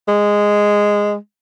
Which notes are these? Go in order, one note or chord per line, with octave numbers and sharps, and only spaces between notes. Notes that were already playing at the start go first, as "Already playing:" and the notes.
G#3